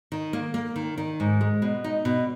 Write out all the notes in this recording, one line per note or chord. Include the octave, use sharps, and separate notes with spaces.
D#3
A#3
A#3
D#3
D#3
G#2
G#3
B2
D#4
B2